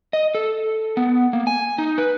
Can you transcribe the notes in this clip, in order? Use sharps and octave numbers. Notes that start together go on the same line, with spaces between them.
D#5
A4
B3
A#3
G#5
D#4
B4